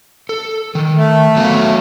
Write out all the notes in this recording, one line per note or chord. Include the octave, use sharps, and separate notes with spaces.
A4
D#3
A3
F#3 B3 F5